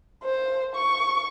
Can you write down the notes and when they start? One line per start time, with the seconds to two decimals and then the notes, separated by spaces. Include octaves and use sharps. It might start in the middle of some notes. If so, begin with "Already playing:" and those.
0.23 C5
0.75 C#6